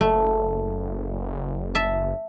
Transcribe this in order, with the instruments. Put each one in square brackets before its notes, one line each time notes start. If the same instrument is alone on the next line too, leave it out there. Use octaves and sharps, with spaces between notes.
[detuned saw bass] F#1 [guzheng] A3
[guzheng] E5 A5